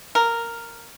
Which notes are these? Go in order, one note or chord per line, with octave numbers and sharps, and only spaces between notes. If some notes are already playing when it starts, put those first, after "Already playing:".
A#4